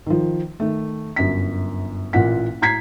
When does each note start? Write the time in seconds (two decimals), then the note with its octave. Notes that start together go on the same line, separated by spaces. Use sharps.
0.06 D#3 F3
0.60 D#3 A3
1.16 G1 F#2 B6
2.13 A1 A#2 F4 F#5 B6
2.61 A2 A#5 G#6 B6 C7